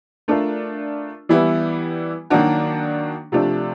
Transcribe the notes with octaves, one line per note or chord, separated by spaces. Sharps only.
A3 D4 F4 A#4
E3 G3 B3 E4
D#3 F#3 A#3 D4 F#4
C3 F3 A3 D4